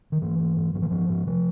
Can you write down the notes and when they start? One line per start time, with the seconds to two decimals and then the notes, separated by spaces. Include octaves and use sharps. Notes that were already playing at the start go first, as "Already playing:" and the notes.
0.12 D#3
0.22 G#2 E3
0.39 G#2
0.57 G#2
0.74 G#2 F3
0.82 E3
0.90 G#2 F3
1.09 G#2
1.27 C3 F3